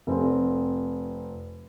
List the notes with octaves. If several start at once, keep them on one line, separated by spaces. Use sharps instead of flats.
F1 C4